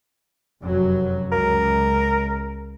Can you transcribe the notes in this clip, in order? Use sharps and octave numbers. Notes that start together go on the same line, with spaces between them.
F1 F#2 F#3
C#2 A#4